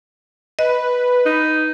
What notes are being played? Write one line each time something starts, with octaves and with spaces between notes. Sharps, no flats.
B4 D#5
D#4